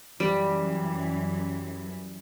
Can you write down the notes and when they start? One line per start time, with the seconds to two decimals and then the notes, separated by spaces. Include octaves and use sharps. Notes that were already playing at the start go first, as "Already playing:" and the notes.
0.20 F#2 E3 G3